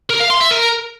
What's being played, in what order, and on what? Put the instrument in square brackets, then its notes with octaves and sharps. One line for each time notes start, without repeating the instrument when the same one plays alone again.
[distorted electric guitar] A#4
F5
C6
E5
A#4